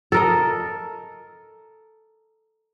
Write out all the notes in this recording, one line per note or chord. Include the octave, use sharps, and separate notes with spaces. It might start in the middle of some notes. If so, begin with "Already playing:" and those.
A4 A#4 D#5